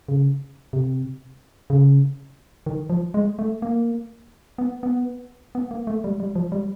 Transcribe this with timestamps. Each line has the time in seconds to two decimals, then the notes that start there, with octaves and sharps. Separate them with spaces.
0.08 C#3
0.73 C3
1.70 C#3
2.66 D#3
2.90 F3
3.14 G#3
3.39 A3
3.62 A#3
4.58 B3
4.83 B3
5.55 B3
5.71 A#3
5.87 A3
6.04 G3
6.20 G3
6.35 F3
6.52 G3